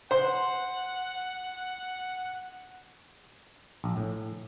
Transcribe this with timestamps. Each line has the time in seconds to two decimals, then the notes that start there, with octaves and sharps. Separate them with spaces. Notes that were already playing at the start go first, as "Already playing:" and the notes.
0.11 C5 F#5 C6
3.84 A#1
3.97 A2